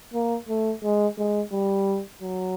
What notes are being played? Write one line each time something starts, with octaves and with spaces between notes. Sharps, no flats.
A#3
A3
G#3
G#3
G3
F#3